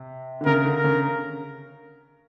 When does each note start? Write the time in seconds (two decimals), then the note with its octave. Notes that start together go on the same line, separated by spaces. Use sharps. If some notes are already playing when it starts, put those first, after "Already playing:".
Already playing: C3
0.41 D3
0.46 C#3 A#4
0.65 D3
0.75 A#4
0.84 C#3